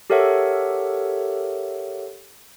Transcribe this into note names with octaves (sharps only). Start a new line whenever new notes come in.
G4 A4 A#4 C#5 E5 F#5